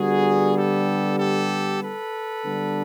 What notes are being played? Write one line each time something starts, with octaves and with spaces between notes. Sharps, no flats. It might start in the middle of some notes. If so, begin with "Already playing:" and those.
Already playing: D3 G3 B3 F#4 G#4
G4 A4
G4 A4
A4 B4
D3 G3 B3 D4